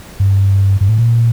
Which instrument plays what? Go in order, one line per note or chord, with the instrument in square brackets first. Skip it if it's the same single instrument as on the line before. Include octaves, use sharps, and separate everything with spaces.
[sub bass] G2
G2
A2
A#2